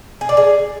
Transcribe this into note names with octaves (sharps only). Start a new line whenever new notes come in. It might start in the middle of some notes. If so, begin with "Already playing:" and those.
G#4
D5
G#4